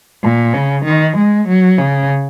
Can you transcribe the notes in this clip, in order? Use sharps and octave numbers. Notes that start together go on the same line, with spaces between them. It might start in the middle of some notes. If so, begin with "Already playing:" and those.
A#2
C#3
D#3
G#3
F#3
C#3